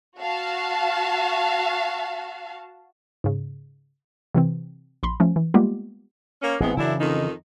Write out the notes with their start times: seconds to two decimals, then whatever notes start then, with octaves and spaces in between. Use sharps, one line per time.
0.21 F#4 F5 A5
3.24 G#2 C#3
4.34 C3 E3 C4
5.03 A#1 B5 C6
5.20 F3 A3 C#4
5.36 E3
5.54 G3 G#3 A#3 B3 F4 G4
6.42 A#3 C#4
6.60 A1 E3 G#3 B3 C4
6.77 F#2 C#3 E3 D4 E4
6.99 F2 D#3 D#4